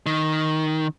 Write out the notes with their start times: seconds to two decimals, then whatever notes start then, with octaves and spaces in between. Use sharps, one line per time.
0.06 D#3